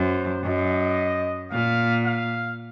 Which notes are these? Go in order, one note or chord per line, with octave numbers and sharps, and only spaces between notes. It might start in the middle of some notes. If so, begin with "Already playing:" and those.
Already playing: F#2 C5
F#2 D#5
A#2 F5
F5